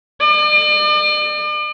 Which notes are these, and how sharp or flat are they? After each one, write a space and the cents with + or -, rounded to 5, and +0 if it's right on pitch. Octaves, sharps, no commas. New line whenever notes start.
D5 +45